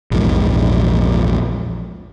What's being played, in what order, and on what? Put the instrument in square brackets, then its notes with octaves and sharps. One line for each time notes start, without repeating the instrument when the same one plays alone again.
[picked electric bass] A#1 E2 G#2